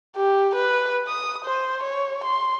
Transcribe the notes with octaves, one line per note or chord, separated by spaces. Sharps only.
G4
B4
D#6
C5
C#5
C6